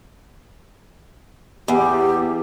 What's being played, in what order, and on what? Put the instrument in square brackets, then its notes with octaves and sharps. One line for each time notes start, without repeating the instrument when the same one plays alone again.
[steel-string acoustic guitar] E2 [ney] G4